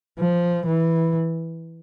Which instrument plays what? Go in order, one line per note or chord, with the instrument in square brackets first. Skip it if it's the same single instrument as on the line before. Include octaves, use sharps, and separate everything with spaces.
[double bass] F3
E3